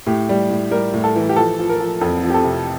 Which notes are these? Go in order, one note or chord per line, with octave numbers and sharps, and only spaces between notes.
A2 G4
G3
A2
G3 A#4
A2
A4
E3
G4
F3 A4
F3
A#4
F3
F2 A4
F3
G4
A4
C3